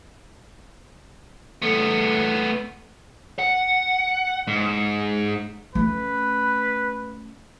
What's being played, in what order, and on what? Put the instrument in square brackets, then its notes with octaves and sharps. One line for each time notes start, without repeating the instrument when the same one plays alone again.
[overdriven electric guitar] A3 B3
[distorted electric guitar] F#5
G#2
[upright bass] A3 C#4 [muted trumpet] B4